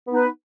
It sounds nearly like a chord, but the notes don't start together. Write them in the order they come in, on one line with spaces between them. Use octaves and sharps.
B3 D#4 B4